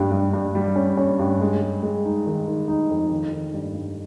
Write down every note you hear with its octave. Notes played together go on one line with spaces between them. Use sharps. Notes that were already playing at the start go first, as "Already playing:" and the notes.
Already playing: G2 G3
G2
G2
G3
C#4
C#4
G2
G#3
G#3
G#3
D#4
D#3
D#3
D#4
F2
D#3
D#3
G2
G2